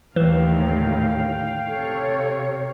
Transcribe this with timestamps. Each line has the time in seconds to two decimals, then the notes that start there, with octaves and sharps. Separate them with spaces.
0.16 D#2 A2 D3 E3 F5 G5
1.68 C3 A4 C#5